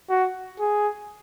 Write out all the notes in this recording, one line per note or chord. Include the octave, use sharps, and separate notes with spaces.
F#4
G#4